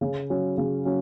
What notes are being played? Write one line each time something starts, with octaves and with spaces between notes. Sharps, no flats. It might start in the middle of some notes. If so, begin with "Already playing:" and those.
C#3
F#3 C#4
C#3
F#3 C#4